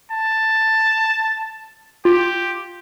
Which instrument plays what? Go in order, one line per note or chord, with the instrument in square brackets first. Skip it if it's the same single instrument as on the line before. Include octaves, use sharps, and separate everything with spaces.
[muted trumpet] A5
[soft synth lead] F4 [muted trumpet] G4